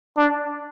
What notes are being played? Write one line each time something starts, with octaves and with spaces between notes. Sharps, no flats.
D4